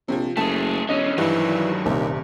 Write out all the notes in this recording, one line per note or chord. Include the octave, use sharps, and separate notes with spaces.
A#1 C3 F3
F#1 A3 G#4 A5
E1 D3 C#4 D#5
G2 D#3 E3 F#3
D#1 D#2 C3